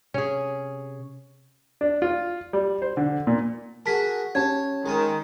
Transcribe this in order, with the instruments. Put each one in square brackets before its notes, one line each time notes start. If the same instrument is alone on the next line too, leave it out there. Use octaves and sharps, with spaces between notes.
[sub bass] C3 [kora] C#4 G#4
[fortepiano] D4
F4
G3
C5
D3
A#2
[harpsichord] F#4 G#4 A#4 [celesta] A5 B6
[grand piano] C#4 G4 A5 [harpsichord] C#5 [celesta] G#6
[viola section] D#3 [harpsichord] G#3 D#6